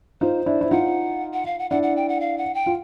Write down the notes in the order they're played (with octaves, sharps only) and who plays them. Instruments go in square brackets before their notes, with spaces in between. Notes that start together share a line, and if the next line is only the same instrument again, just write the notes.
[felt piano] D#4 F4 [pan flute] C5
[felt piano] D4 E4
E4
[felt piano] D#4 F4 [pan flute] F#5
[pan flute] F#5
F5
F#5
[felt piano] D4 E4 [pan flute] F#5
[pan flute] F#5
G5
F#5
F5
F#5
G5
[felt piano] F4